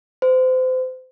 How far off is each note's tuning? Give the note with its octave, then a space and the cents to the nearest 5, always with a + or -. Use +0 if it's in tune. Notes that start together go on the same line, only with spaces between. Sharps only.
C5 -30